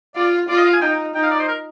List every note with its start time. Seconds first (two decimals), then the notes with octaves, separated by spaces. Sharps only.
0.16 F4 D5
0.49 F4 D5
0.57 D#5
0.65 F5
0.74 G#5
0.81 D#4 G5
1.15 D#4 G5
1.23 F5
1.31 D5
1.39 C5
1.48 A#4